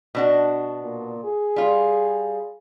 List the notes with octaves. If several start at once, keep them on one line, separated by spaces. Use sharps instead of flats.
B2 D4 F#4
A#2
G#4
G3 F4